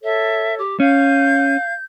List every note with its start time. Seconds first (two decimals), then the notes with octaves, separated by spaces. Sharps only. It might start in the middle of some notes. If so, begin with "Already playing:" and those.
0.04 A4 C#5 E5
0.58 G4
0.80 C#4 F5 G6